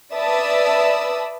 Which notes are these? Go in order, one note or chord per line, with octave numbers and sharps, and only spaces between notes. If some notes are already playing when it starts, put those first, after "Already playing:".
B4 D5 E5 A5 D#6 E6